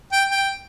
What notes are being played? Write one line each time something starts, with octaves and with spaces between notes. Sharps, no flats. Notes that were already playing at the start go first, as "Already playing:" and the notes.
G5
G5